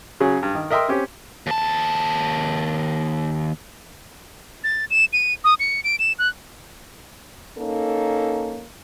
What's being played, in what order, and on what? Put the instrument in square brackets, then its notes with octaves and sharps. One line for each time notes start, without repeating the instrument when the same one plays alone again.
[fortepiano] C#3 F#3 C#4 G#4
G2
D#3
A#4 D#5 E5 G5 C6
C4 C#4 G4
[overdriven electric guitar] D#2 A5
[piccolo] A6
E7
D#7
D#6
C#7
D7
E7
F#6
[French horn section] A#3 C#4 D#4 A4